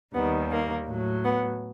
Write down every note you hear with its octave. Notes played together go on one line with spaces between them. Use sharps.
D#2 D#3 G3 B3
A#3
A2 F#3
B3